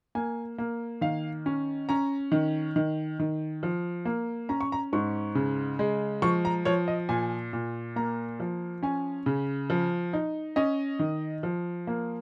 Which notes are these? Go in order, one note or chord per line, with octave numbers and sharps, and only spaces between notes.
A#3 G#5
A#3
D#3 F5
C#4
C#4 A#5
D#3
D#3
D#3
F3
A#3
C#4 A#5
C#6
A#5
G#2 C#6
C#3
G#3
F3 C#6
A#5
F3 C#5
D#5
A#2 G#5
A#2
A#3 A#5
F3
C#4 G#5
C#3
F3
D#4
C#4 D#5
D#3
F3
A#3